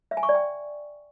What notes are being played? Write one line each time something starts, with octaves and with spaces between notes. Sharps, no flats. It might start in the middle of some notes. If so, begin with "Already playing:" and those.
E5
G#5
C#6
D5
G5